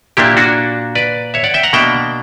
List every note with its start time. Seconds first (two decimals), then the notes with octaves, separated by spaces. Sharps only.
0.17 A#2 A#3 D4 E4 G4
0.37 D4 F#4
0.95 B4 D5
1.34 C#5 E5
1.44 D5 F#5
1.54 E5 G5
1.63 F#5 A#5
1.73 B2 A#3 D4 E5 G5